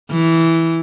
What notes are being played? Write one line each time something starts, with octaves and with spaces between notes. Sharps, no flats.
E3